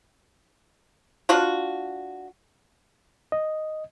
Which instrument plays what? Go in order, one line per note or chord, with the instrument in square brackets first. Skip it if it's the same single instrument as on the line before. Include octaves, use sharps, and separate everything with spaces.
[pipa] D4 F4 F#4
[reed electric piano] D#5